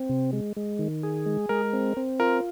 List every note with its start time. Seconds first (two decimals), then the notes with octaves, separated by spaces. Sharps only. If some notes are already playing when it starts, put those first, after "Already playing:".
Already playing: C4
0.09 C3
0.33 G#3
0.57 G#3
0.79 D#3
1.03 G#4
1.26 G#3
1.49 G#3 A#4
1.73 C4
1.97 C4
2.20 F4 A#4